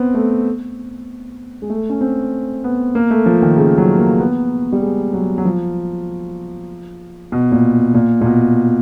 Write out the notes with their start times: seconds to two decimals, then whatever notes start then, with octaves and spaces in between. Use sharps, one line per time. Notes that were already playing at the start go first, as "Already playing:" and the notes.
Already playing: B3 C4
0.14 A3
1.62 G#3
1.70 A3
1.90 C#4
2.01 C4
2.64 B3
2.95 A#3
3.11 A3
3.26 F3
3.42 D#3
3.57 C#3
3.78 F#3
3.99 A#3
4.20 B3
4.72 G3
4.82 G#3
5.13 F#3
5.38 F#3
5.45 F3
7.32 B2
7.52 A#2
7.95 A#2
8.21 A#2
8.26 B2